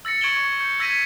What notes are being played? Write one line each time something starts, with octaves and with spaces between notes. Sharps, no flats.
E6 A6 A#6 C#7
C#6 G#6 D7 E7 F#7 G7
C#6
G6 C#7
E6 G#6 A#6 B6 C#7 D#7